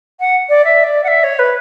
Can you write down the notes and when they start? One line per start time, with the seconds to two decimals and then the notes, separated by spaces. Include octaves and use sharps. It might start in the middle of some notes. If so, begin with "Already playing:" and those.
0.20 F#5
0.49 D5
0.65 E5
0.84 D5
1.04 F#5
1.08 E5
1.23 C#5
1.39 B4